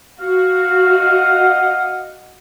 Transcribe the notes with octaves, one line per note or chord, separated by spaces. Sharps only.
F#4 F5
D#5 F#5